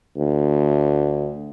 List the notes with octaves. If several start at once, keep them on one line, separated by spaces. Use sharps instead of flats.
D2